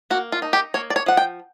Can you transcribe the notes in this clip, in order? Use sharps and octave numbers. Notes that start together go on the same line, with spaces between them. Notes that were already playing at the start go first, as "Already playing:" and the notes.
A#3 F#4
F4
D#4
G4
A#3 C#5
D5
C#5
F3 F#5
G5